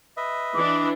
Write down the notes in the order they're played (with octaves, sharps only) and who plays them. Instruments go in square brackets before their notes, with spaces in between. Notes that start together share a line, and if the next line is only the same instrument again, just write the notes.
[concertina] B4 D#5 E5
[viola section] E3 D4 [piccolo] D6